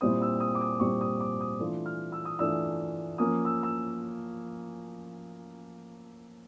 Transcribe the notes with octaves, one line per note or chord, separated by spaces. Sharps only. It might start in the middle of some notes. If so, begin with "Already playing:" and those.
A#2 G3 C4 E4 D#6
E6
D#6
D6
D#6
A#2 G3 C4 E4 C#6
D#6
D6
D#6
E3 A3 D4 F4
F6
E6
D#6
E3 A3 D4 F4 E6
F3 A#3 C#4 D#6
E6
E6